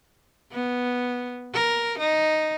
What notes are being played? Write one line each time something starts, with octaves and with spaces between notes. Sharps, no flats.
B3
A#4
D#4